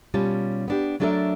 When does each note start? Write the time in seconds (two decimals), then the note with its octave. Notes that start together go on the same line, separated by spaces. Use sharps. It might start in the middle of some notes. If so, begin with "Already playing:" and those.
0.14 B2 G3 C#4 F4 A5
0.68 B3 D4 G4
1.00 F#3 A3 D4 A4 A#4 E5